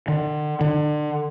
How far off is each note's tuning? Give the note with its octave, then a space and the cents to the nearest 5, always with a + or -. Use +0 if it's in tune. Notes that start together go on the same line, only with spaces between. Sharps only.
D3 +40
D3 +30